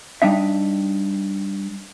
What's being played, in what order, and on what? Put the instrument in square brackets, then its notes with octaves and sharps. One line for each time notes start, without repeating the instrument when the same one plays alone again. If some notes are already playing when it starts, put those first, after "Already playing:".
[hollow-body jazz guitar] G3 D4 D#4 E5